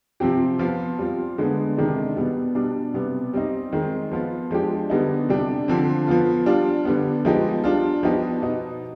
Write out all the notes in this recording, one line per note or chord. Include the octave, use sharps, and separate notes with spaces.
C3 F3 C4 G4
F3 B3 F4
G3 C4 F4
D3 G#3 B3
C3 D#3 G#3 D4
B2 G3 B3
B2 G3 D4
C3 G3 B3
G3 C4 D#4
D#3 G#3 C4
F3 B3 F4
F3 G#3 D4 G4
D3 G3 B3 D#4
C3 G3 D4 G4
D3 F3 C4
F3 B3 F4
G3 D4 F4
D3 G3 B3
F3 G#3 B3 D#4 G4
G3 D4 F4
F3 B3 D#4 G4
B2 B3 D#4